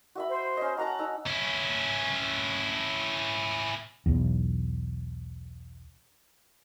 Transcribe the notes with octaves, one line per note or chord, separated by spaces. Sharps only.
F#4 E5 B5
C5
C#4 D#5
F#4 F#5 A5 A#5
D#4 E6
C#4 E4
B1 E2